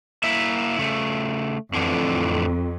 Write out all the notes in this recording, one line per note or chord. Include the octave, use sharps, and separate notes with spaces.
A#3 E4 E5
C#3 A3
F2 A2 D3 E3